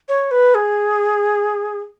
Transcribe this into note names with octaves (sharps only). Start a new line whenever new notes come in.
C#5
B4
G#4